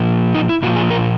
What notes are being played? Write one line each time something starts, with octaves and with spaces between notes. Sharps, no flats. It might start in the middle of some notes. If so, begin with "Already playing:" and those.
Already playing: A#2 F3
D#4
E4
A#2 F3 F#4
G#4
A#4